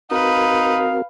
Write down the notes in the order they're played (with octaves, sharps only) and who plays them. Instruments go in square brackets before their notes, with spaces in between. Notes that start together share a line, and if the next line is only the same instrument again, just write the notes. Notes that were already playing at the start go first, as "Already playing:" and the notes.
[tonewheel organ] C4 F#4 A#4 [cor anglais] D#4 [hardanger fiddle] B4 [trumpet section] F5